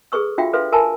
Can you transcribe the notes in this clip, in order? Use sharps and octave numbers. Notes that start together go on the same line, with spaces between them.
G#4 A4 B4 C#6 E6
D4 F4 F#4 E5 F5 G5
A4 B4 E5 F5 C6
A#4 E5 G#5 A5 B5